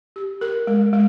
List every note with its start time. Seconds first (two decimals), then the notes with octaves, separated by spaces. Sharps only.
0.16 G4
0.41 A#4
0.67 G#3
0.93 G#3